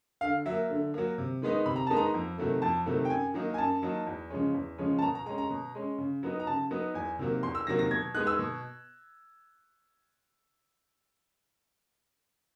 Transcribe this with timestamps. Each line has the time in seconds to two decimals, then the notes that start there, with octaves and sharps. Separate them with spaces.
0.21 D3 F5
0.46 F#3 A#3 E5
0.70 D3
0.94 F#3 A#3
1.18 C3
1.42 D#3 G#3 B3 D#4
1.66 C3 B5
1.76 A#5
1.87 D#3 G#3 B3 D#4 A5
1.97 A#5
2.14 F2
2.38 C3 D#3 F#3 A3
2.62 F2 A5
2.86 C3 D#3 F#3 A3
3.05 G5
3.10 F#2 G#5
3.34 D#3 F#3 A#3 D#4
3.54 G#5
3.58 F#2 A5
3.82 D#3 F#3 A#3 D#4
4.07 E2
4.30 C#3 F3 G#3 C#4
4.54 E2
4.78 C#3 F3 G#3 C#4
4.99 A5
5.02 B2 A#5
5.15 A#5
5.26 G#3 A#5
5.29 C#4
5.38 A#5
5.50 B2
5.75 G#3 C#4
5.98 C#3
6.23 F#3 B3 D#4
6.40 A#5
6.47 C#3 A5
6.71 F#3 B3 D#4
6.94 E2 G#5
7.19 C3 D#3 F#3 A#3
7.43 E2 C6
7.55 E6
7.67 C3 D#3 F#3 A#3 A#6
7.79 A#6
7.91 B2 G#6
8.14 G#3 B3 D#4 F#6
8.27 E6
8.39 B2